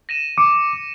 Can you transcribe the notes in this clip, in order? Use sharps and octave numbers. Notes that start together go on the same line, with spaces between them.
A#6 D#7 E7
D6 C#7